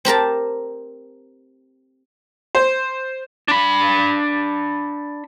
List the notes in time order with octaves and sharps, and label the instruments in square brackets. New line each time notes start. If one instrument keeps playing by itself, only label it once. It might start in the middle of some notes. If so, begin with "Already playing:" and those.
[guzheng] C4 G4 A#4 A5
[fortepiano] C5
[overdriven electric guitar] D4 B5